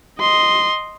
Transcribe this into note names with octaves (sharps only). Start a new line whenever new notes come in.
D#5 C6